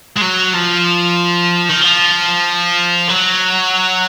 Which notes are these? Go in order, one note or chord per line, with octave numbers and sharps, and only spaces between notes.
G#3
F#3
F3
D#3
F3
F#3